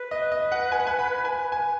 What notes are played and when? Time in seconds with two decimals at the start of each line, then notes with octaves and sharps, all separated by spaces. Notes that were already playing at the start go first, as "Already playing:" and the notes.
Already playing: B4
0.11 D#5
0.32 D#5
0.52 F#5
0.72 G#5
0.79 F#5
0.87 G#5
0.99 B5
1.18 B5
1.25 G#5
1.52 G#5